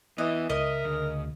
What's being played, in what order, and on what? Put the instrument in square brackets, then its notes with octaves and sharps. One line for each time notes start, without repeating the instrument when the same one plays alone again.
[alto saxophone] E3 [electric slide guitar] B3 E4 [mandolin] D#5
[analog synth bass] C#2 [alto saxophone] A#4 [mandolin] D#5 [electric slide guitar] E5
[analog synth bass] D2 [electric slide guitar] C#3